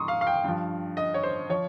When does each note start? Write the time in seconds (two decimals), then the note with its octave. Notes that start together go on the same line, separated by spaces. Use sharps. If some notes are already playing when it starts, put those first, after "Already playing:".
Already playing: G#2 F3 A#5 C6 C#6 D#6
0.08 F5
0.21 F5
0.27 G5
0.44 G2 F3
0.97 D#5
1.14 C#5
1.23 C5
1.49 F3 C#5